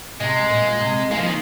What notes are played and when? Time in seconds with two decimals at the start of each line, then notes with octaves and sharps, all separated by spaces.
0.20 C3 G#3
0.50 A#2
0.81 C3
1.11 G#3 A#3 D#4
1.18 F3
1.26 D#3